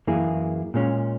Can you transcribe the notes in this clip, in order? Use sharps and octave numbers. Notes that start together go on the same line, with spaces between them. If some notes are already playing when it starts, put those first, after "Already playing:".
F#2 E3 A#3 E4 G#4
A#2 G#3 C#4